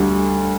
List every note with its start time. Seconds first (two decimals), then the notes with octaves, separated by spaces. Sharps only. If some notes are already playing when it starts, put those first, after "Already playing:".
Already playing: D2 D3 G3